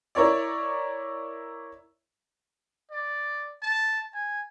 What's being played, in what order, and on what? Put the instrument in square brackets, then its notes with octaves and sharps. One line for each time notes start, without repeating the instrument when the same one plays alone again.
[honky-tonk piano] E4 A#4 C#5 D5
[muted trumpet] D5
A5
G#5